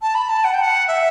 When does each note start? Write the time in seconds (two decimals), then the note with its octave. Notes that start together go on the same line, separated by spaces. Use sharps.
0.02 A5
0.15 B5
0.29 A5
0.44 F#5
0.54 G5
0.62 F#5
0.88 E5